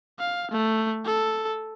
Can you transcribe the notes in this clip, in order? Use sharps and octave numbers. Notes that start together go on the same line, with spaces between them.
F5
A3
A4